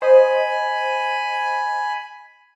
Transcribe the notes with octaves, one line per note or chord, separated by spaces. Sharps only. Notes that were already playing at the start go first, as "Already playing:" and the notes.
C5 D#5 G#5 B5